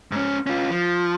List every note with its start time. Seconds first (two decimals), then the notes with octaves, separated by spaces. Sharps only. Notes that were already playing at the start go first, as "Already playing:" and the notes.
0.12 G#2 C#4
0.47 C#4 F4
0.71 F3